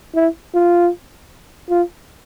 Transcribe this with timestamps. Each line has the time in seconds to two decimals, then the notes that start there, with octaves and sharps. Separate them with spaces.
0.16 E4
0.54 F4
1.70 F4